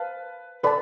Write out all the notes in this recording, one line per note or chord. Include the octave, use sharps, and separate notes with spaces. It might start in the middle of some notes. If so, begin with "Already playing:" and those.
Already playing: B4 C5 F5 A5
A4 B4 D5 A5 B5